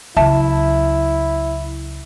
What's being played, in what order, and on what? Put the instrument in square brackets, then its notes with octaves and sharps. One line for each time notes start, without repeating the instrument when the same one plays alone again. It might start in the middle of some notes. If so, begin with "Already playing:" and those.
[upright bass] C#2 F#3 [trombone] E4 [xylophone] E5 A5